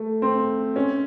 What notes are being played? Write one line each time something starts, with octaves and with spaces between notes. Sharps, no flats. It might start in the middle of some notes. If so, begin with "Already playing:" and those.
Already playing: A3
C4
C#4